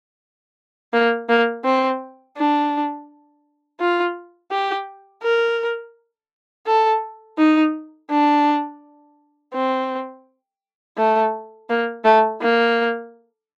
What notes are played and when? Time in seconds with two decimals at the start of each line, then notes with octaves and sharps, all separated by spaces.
0.93 A#3
1.29 A#3
1.64 C4
2.37 D4
3.80 F4
4.51 G4
5.23 A#4
6.67 A4
7.38 D#4
8.10 D4
9.54 C4
10.97 A3
11.69 A#3
12.04 A3
12.41 A#3